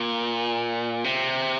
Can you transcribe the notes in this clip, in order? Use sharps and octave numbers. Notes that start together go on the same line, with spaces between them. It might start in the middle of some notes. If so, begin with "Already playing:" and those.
Already playing: A#2
C3